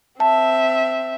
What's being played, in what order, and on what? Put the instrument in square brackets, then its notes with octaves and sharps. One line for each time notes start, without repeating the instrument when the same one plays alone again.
[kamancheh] C4 E5 [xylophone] A5